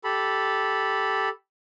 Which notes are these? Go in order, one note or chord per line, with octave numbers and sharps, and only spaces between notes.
G4 A4 B5